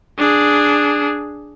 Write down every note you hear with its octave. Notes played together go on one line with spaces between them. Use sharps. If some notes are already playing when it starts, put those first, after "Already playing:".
D4 G#4